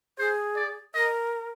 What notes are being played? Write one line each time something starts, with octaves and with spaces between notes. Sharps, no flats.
G#4 C5
D5
A#4 D#5